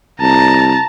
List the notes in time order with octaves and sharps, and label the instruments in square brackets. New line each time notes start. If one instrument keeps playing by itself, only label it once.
[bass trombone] C2 [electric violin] A5 A#5